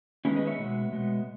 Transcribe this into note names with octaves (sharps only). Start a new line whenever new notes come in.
D#3 G#3 B3 C#4 E4
B4 D#5
C#5 E5
B2 G#3 B3
B2 G#3 B3